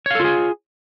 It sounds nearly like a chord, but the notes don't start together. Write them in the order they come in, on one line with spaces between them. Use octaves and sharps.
C#5 F5 A4 F4 G#4